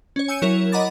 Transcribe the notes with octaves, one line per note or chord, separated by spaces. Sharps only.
C#4 C#5
G#5 E6 G6 C#7 D#7
F#3 E4 A#4 C#5
D#5 F#5 A#5 B5 D6 A6